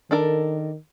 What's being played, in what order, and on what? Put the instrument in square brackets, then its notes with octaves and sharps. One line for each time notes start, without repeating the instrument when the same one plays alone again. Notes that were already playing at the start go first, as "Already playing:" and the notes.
[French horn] D#3 [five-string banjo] D4 A4 A#4